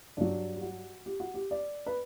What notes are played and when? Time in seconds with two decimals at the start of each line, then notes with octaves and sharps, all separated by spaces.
0.17 G2 F#3 D4
0.55 G4
0.62 F#4
1.06 G4
1.20 F#4
1.34 G4
1.51 D5
1.86 B4